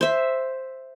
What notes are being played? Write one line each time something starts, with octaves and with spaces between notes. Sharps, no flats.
C5 E5